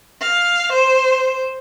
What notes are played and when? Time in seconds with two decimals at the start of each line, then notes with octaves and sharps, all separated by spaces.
0.20 F5
0.72 C5